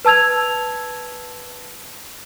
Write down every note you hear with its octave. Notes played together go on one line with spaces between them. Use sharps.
B4 A5 E6 G#6 F7